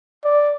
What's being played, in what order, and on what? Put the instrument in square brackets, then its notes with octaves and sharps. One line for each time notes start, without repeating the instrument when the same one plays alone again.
[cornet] D5